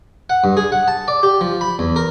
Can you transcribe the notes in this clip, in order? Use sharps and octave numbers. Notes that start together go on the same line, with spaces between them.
F#5
G2
G#4
F#5
A5
D5
G4
F3
B5
E2
A#4